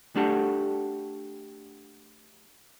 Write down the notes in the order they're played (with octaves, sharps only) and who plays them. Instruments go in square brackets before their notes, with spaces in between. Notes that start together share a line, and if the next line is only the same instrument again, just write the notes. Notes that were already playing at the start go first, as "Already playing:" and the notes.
[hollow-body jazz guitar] A3 D4 F#4 G4 A4